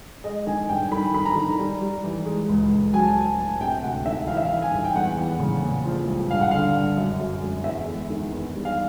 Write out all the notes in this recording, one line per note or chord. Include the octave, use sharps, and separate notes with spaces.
G#3 D#5
D#3 G#5
G2 G5
D#3 B5
D#3 B5
A#5
D#3
G3
G3
E3
G#3
C#2
C#2
F#3 G#5
A5
G#5
F#3
A2
C3 G5
D2 F#5
D#3 E5
E3 F5
E5
F5
E3
G#5
G2
G5
E2 F#5
E3
C#3
A#2
F3
C2
G2 F5
F#5
D3 F5
G2
F#2
F#2
F#2
E2 E5
G#3
D#3
E2
G3
F5